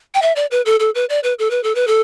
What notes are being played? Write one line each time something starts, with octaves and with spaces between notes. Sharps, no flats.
G5
E5
D5
B4
A4
A4
B4
D5
B4
A4
B4
A4
B4
A4